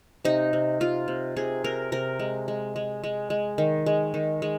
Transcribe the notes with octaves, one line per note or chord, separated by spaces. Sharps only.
C3 D#4
C3
C3 F4
C3
C3 G#4
C3 A#4
C3 A#4
G#3
G#3
G#3
G#3
G#3
D#3
G#3
D#3
G#3